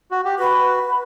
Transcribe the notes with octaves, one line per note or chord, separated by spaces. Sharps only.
F#4
G4
F#4 B4